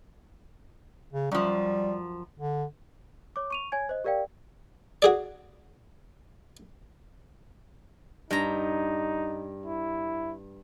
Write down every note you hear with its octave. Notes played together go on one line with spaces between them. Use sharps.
C#3
F#2 F3 G3
D3
C#5 D6
C#6 D#7 F7
C#5 G#5 G#6
C5 D#5
G4 A#4 D5 F5 G5
F#4 G#4 D5
G2 D#4 A#5
E4